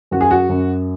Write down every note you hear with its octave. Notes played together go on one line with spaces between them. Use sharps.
F#2 F#4
G#4
F#4
F#2